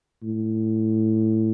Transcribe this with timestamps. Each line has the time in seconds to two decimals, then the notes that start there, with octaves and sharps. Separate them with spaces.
0.23 A2